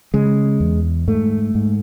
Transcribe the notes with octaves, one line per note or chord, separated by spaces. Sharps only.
C#3 G#3
E2
G#2 A3
G#2